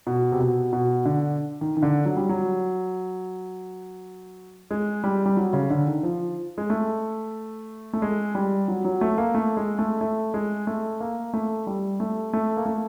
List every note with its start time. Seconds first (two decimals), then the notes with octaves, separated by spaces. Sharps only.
0.07 B2
0.32 C3
0.40 B2
0.73 B2
1.05 D3
1.61 D#3
1.77 D#3
1.83 D3
2.05 F#3
2.17 G3
2.29 F#3
4.71 G#3
5.04 G3
5.26 G3
5.37 F#3
5.53 C#3
5.70 D3
5.86 D#3
6.03 F3
6.58 G#3
6.70 A3
7.93 A3
8.02 G#3
8.35 G3
8.68 F#3
8.85 F#3
9.01 A3
9.18 A#3
9.34 A3
9.57 G#3
9.79 A3
10.01 A3
10.34 G#3
10.67 A3
11.00 A#3
11.33 A3
11.67 G3
12.00 A3
12.33 A3
12.57 A#3
12.66 A3